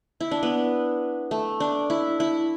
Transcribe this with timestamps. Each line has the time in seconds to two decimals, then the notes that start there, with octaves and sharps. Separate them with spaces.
0.20 E4
0.31 D4
0.43 B3
1.31 A3
1.60 D4
1.90 E4
2.20 E4